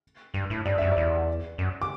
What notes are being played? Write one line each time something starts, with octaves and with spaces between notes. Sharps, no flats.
G2
A2
G2 D5
F#2 E5
D5
E2
F#2
D6